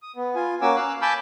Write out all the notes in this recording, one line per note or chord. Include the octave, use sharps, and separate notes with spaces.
D#6
B3
F4 G#5
A#3 C#4 F#4 G#5 D6 E6
F5 E6 F#6
G#5 A5 B5 D6 E6 G6